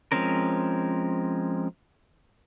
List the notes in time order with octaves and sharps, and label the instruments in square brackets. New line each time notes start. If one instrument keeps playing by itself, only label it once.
[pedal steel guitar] F3 G#3 C4 C#4 A#4